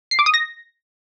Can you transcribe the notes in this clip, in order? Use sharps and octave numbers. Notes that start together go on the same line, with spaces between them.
C7
D6
D#6
A#6